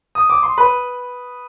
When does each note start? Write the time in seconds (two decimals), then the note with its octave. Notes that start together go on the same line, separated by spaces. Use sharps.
0.15 D#6
0.30 D6
0.43 C6
0.58 B4 B5